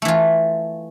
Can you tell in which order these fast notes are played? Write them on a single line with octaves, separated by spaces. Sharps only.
A3 E3 F4